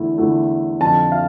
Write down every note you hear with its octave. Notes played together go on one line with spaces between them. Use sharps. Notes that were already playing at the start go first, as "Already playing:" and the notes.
Already playing: E2 D3 A3 E4
E2 D3 A3 E4
F2 D3 F3 A5
F5